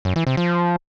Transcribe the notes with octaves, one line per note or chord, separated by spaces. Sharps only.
F#2
E3
C3
F3